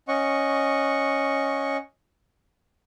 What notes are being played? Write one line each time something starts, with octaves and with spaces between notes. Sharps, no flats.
C#4 D#5 F#5 C#6